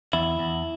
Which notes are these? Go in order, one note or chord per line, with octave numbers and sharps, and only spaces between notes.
E2 E4
E2